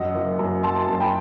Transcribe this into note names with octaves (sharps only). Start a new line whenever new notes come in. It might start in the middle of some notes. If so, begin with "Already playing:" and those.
Already playing: F#2 D#5 F#5
F#1
F#2
F#3 A5 C6
F#2
G5 B5